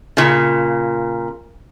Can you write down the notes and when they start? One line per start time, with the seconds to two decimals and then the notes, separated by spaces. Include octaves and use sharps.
0.17 A#2 C#3